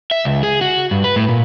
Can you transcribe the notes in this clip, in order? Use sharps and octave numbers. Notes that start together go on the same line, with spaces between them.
E5
C#2
G#4
F#4
G2
B4
A2
A#2